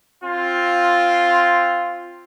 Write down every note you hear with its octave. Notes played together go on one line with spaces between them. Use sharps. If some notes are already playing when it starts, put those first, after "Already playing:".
C4 F4